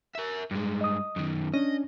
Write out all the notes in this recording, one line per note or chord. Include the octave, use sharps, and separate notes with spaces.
A#4 E5
G2 G#3
D#5 D#6
F#2 D#3
C#4 D4 D#5